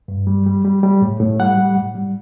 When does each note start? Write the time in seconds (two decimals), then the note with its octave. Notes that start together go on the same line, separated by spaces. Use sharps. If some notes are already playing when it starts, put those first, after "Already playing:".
0.08 G2
0.27 G3
0.46 G3
0.65 G3
0.83 G3
1.02 A2
1.20 A2
1.40 G3 F#5
1.57 G3
1.76 A2
1.95 G3